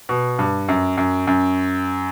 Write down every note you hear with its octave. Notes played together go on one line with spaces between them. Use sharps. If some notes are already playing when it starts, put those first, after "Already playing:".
B2
G2
F#2
F#2
F#2